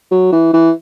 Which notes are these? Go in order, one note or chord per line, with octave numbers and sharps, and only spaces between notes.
F#3
E3
E3